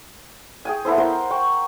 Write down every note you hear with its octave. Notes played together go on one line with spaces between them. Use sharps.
G#4 G5 G#5
B3 E4 A4 C5
A#4 C5 F5 F#5
G5 C#6